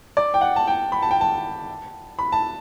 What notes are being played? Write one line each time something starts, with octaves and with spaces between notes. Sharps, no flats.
D5
G5
F#5
A5
G5
B5
A5
G5
A5
B5
A5